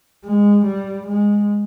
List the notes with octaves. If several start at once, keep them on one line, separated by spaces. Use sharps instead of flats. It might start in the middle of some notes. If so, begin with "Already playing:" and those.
G#3
G3
G#3